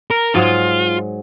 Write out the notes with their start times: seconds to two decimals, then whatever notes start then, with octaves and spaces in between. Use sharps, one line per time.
0.11 A#4
0.35 G#2 F#3 G#3 F4